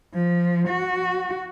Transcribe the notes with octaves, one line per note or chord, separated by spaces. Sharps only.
F3
F#4